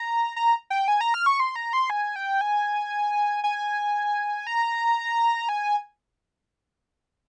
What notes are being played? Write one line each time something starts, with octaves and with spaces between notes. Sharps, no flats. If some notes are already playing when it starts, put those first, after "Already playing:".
Already playing: A#5
A#5
G5
G#5
A#5
F6
C#6
C6
A#5
C6
G#5
G5
G#5
G#5
A#5
G#5